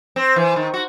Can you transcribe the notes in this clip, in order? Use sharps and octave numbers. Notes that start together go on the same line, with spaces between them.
C4
E3
D#3
F#4